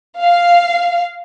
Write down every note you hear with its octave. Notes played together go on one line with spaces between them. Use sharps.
F5